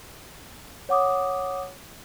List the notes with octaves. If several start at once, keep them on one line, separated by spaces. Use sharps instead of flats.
C#5 F#5 D6 D#6